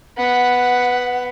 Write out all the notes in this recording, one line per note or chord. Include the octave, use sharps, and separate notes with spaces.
B3 F#5